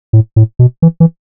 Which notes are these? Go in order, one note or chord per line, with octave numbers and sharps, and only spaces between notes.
A2
A2
B2
E3
E3